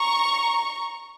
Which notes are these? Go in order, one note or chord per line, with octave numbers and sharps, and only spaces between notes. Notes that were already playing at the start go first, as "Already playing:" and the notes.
Already playing: A#5 C#6